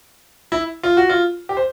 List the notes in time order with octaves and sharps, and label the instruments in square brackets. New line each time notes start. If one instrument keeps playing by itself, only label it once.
[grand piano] E4
F4
F#4
F4
G4
C5